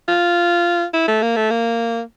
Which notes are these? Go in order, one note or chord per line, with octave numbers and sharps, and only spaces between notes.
F4
E4
A3
A#3
A3
A#3